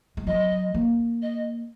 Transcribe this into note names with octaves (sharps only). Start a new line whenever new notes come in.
G#3
F#3 D#5
A#3
D#5